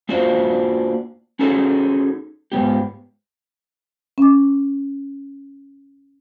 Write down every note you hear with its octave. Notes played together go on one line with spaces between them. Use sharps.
A#3 D4 F4 F#4 C5
C#4 D#4 F#4 G#4 A4
G#2 C3 B3 G4
C#4 D6